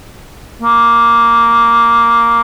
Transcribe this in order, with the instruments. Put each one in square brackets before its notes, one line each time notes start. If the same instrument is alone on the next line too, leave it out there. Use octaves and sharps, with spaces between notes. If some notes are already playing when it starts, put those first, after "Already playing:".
[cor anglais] A#3